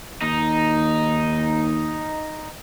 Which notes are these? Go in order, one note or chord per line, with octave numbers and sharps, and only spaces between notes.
D#2 D#4